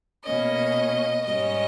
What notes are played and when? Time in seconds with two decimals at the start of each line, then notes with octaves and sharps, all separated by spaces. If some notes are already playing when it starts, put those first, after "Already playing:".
0.25 B2 A#3 C#4 D#5
1.25 G#2 G3 C#4 D#5